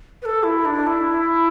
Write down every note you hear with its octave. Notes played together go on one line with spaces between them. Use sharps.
B4
A4
E4
D4
E4